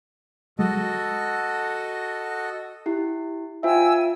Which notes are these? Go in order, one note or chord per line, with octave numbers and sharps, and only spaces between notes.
F#3 G#3 F#4 A4 D#5
E4 G4
F4 C5 E5 G5 G#5 E6